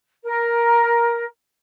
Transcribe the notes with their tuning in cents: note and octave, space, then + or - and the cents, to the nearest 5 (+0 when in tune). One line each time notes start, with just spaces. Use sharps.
A#4 +10